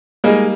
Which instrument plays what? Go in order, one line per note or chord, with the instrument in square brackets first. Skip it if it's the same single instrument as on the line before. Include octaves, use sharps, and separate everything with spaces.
[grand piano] G3 A#3 D#4 [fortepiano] G#3